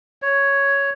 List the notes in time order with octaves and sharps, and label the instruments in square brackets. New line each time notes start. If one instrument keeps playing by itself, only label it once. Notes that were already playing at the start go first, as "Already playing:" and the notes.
[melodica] C#5